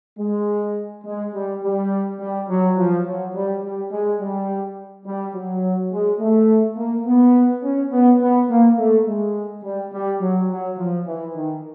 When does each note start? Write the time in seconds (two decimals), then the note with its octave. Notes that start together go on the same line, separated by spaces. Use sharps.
0.19 G#3
1.05 G#3
1.33 G3
1.63 G3
2.19 G3
2.49 F#3
2.77 F3
3.05 F#3
3.34 G3
3.62 G3
3.91 G#3
4.20 G3
5.06 G3
5.34 F#3
5.92 G#3
6.19 A3
6.77 A#3
7.06 B3
7.62 C#4
7.91 B3
8.20 B3
8.49 A#3
8.78 A3
9.06 G#3
9.63 G3
9.92 G3
10.20 F#3
10.49 F#3
10.77 F3
11.06 E3
11.35 D#3